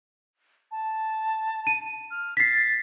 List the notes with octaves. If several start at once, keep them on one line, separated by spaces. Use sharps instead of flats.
A5
D#7
F6
A6 B6 C7